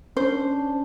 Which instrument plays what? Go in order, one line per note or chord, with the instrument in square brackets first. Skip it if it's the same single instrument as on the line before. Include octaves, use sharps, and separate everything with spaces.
[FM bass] C#4 [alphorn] D4 [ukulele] C5